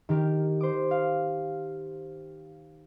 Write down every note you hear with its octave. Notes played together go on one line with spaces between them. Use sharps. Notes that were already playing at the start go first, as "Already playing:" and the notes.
D#3 G4 A#4
C5 D6
F5